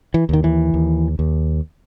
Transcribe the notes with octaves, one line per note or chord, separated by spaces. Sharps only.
E3
D#2 D#3
E3
D#2
D#2